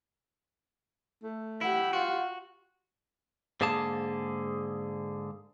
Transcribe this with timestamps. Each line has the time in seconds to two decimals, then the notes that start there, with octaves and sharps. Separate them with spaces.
1.23 A3
1.61 E4 G4 F#5
1.93 F4 F#4
3.61 G#2 D3 A#3 G#4 A5